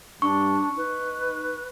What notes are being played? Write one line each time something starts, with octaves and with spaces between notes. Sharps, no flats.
G2 D4 C#6
D#4 B4